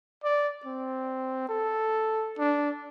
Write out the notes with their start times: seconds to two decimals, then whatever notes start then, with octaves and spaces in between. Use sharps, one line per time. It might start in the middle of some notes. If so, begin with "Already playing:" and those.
0.24 D5
0.65 C4
1.49 A4
2.38 D4